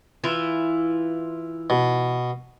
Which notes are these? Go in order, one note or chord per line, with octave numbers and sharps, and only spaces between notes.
E3 E4 F4
B2